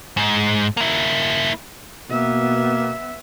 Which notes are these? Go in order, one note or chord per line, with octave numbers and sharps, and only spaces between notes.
G#2
A#3 E4
B2 A#3 B3 E5